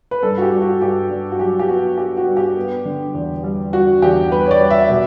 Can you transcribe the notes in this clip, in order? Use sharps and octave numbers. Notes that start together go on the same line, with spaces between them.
B4
G2 A4
F#4
G4
G2
F#4
G2 G4
G2
F#4
F#3 G4
G4
B3 F#4
B3 G4
F#4
G2
G4
B3
D3
E2
G3
G3 F#4
E2 G4
G3 B4
C#5
D5
G3
E5
B2